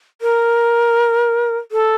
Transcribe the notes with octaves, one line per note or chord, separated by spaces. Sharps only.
A#4
A4